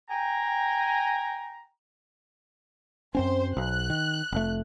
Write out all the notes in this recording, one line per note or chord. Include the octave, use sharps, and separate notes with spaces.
G5 G#5 A#5
F#2 C4 C#4 C5
B1 F#6
D#3
F1 A3